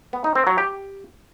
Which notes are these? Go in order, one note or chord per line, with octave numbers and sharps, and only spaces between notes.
B3
D#4
C4
F#3
G4